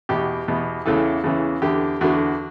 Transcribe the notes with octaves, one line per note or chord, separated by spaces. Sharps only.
E2 B2 G4
E2 B2
E2 C#3 E3 A4
E2 C#3 E3
E2 D3 G4
E2 D3 F#4